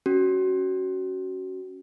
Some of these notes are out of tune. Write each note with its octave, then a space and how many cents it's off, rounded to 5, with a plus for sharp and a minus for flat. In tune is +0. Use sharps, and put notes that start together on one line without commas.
C#4 +0 F#4 +15